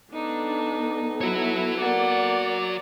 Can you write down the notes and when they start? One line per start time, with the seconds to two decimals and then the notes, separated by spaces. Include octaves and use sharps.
0.13 B3 D4 D#4 A4
1.21 E4 F#4 C#5
1.80 A#3 D5 F#5